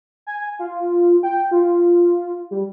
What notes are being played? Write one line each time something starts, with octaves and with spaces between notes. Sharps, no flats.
G#5
F4
G5
F4
G3